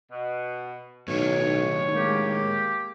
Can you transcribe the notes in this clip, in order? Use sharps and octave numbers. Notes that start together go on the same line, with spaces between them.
B2
B1 A2 D#3 C#5
G#3 A#3 G4